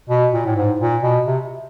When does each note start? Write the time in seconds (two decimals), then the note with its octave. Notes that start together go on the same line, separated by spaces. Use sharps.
0.09 B2
0.32 A#2
0.46 A2
0.56 G#2
0.80 A#2
1.03 B2
1.27 C3